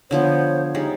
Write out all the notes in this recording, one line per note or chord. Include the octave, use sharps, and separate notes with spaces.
D3 F3 B3 C5 C#5
G3 G#3 D#4